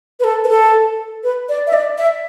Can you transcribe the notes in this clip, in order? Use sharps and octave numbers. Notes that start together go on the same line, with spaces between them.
B4
A4
B4
A4
B4
D5
E5
D5
E5